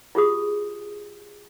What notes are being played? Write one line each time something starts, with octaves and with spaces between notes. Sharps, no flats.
F4 G4 G#4 D#6